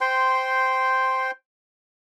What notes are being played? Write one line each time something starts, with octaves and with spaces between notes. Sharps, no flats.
C5 G5 C6